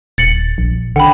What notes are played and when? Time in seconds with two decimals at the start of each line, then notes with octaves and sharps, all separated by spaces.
0.18 D#1 A6 C#7 F#7
0.58 A#1
0.96 D3 F#5 G5 B5